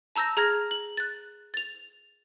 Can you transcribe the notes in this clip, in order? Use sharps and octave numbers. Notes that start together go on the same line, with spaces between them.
A5 A#5 E6 G6 A#6
G#4 A#5 F6 G#6 A#6
F#7
F#6 A6
A6 F7